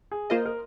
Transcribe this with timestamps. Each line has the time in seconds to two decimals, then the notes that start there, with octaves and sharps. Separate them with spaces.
0.11 G#4
0.30 A#3 F4 A#4 C5 D#5
0.46 A#4